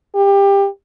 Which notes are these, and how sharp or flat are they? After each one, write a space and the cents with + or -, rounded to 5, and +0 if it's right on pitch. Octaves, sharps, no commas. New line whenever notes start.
G4 +20